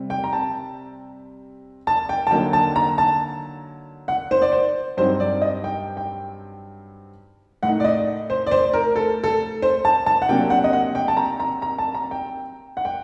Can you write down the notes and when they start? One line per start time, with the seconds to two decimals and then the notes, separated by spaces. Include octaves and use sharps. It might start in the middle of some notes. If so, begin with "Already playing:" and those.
Already playing: C3 G3 C4
0.10 G5
0.24 A#5
0.33 A5
1.87 A5
2.09 G5
2.27 A5
2.31 D3 F#3 A#3 D#4 G5
2.53 A5
2.76 A#5
2.98 A5
4.08 F#5
4.31 C5
4.42 D5
4.52 C5
4.97 G2 F#3 C4 D#4 C5
5.20 D5
5.42 D#5
5.64 G5
5.97 G5
7.63 A2 A3 D#4 F#5
7.80 D5
7.84 D#5
8.30 C5
8.46 D5
8.51 C5
8.74 A#4
8.96 A4
9.24 A4
9.62 C5
9.85 A5
10.06 A5
10.22 F#5
10.29 C3 F#3 A#3 D4 G5
10.50 F#5
10.64 D#5
10.73 F#5
10.95 G5
11.08 A5
11.17 A#5
11.40 A#5
11.62 A#5
11.78 A5
11.95 A#5
12.11 G5
12.77 F#5
12.85 G5